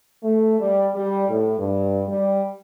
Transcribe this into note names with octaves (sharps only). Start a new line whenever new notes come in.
A3
G3
G3
A2
G2
G3